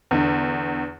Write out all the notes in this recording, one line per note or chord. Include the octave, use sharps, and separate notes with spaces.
E2 D3